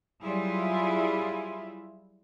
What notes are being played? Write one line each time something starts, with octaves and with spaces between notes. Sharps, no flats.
F#3 G3 E4 F4 G#4